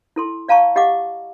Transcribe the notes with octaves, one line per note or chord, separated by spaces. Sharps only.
E4 A4 C6
D5 F5 A5 A#5 C#6
G4 D#5 F5 F#5 D6